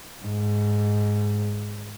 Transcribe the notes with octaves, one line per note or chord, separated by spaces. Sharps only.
G#2